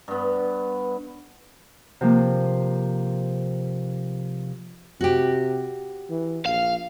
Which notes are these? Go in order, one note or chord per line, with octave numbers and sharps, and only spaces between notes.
G2 B3
C3 F3 A#3
C3 F#4 G4
E3
A#1 F5